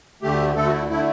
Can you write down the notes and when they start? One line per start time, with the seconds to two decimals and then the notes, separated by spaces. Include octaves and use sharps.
0.22 D2 D3 A3 G4
0.55 D2 D3 A3 A4
0.67 F#4
0.72 E4
0.89 D3 A3 E4